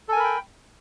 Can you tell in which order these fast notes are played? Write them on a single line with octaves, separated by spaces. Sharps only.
A4 G#5 A#4 B5 G5